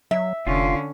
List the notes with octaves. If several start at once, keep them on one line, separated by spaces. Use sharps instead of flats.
F#3 E5
F1 D3 C#4 F4